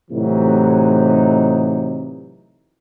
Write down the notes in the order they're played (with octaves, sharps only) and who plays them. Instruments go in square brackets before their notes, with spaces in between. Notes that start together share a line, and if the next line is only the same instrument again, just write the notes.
[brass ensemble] A2 C3 E3 F#3 D#4